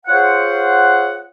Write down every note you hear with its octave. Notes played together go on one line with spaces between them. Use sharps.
F4 G#4 C5 C#5 F#5